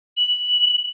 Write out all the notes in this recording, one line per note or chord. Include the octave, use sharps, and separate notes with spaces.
F#7